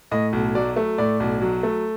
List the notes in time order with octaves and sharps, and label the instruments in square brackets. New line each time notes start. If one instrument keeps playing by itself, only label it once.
[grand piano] A2 D#5
B1
F#3 D5
A3
A2 D5
B1
F#3
A3